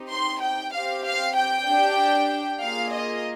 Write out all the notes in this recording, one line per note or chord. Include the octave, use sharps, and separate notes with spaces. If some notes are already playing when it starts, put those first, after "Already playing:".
Already playing: C4 D#4 G4
C6
G5
C4 G4 F5
F5
G5
D4 G4
A#3 F4 G#4 F5
D#5